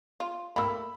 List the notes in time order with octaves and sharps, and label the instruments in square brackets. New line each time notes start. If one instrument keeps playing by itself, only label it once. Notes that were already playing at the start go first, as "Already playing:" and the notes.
[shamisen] F4
[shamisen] A3 A#3 [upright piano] B5 E6